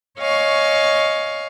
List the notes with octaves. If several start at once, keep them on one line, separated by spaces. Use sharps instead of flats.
C#5 D#5 F5 G#5 C#6